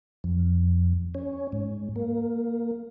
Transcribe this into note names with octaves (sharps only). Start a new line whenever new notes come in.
F2
C#4
G#2
A#3